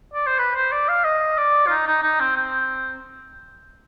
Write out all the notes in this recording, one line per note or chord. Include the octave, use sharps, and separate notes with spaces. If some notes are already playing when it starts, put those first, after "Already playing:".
D5
C5
B4
C5
D5
F5
D#5
D5
F4
D#4
D#4
D#4
C4
C4